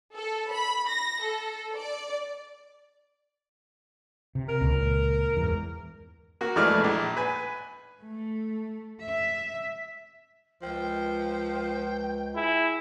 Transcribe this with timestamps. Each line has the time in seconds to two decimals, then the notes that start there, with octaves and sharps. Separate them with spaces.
0.14 A4
0.53 B5
0.89 A#6
1.22 A4
1.76 D5
4.35 C3
4.49 A#4
4.61 C#2 A#2
5.37 E2 G#2
6.41 A#3 F#4
6.56 F2 E3 G#3 A3 D5 F6
6.80 A#1 A#2
7.16 B4 G#5
8.03 A3
9.02 E5
10.62 C#2 F3 G5
12.35 E4 G#4